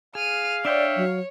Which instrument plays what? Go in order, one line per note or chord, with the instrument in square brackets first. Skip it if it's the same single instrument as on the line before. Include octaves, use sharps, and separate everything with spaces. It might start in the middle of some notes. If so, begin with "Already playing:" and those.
[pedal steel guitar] G#4 [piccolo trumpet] F5 [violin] F6 D#7
[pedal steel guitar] D4 E5 G5 [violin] C#5 [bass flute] D5
[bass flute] F#3